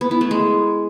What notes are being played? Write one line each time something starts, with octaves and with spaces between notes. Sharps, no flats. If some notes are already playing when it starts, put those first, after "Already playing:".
B3
E4
A3
G#3